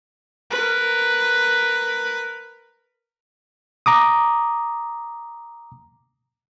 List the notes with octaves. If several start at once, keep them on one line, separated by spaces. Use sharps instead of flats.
A#4 B4
A#5 D6 D#6